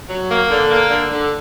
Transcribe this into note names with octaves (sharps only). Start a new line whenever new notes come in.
F#3
A#3
D3
A#3
D3
D3